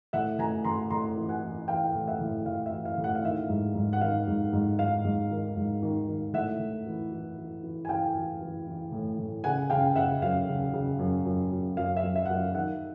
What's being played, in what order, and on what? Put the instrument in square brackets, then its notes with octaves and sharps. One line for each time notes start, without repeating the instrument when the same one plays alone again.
[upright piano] A2 E5 F#5
A2 G#5 A#5
A2 A#5 C6
A2 A#5 C6
E3
F#5 G#5
E3
E3 F5 G5
A2
E5 F#5
A2
A2 F5
E5
E3
F5
A2
F#5
F5
D#3 E5
F5
G#2
G#2
F#5
D#3 F5
G#2
G#2
G#2 F5
G#2
D#3
G#2
D#3
D#3
A2 E5 F#5
A2
E3
E3
E3
E3
G#5
E3 F5 G5
E3
E3
E3
A2
A2
C#3 F#5 G#5
C#3 F5 G5
C#3 E5 F#5
F#2 F5
C#3
C#3
F#2
F#2
F#2
F#2 F5
E5
F#2
E5
F#2 F#5
F5
D#3 E5 F#5